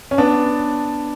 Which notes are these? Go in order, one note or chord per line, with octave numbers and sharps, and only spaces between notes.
C#4
B3 D4